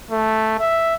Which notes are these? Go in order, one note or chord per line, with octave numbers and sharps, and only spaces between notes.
A3
E5